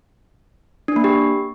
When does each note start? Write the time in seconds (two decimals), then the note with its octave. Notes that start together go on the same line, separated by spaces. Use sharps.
0.88 D4
0.96 A#3
1.04 G4